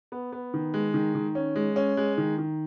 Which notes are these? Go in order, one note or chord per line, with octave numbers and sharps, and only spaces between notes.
B3
B3
D#3
G#3
D#3
D#3
C#4
G#3
C#4
G#3
D#3
D#3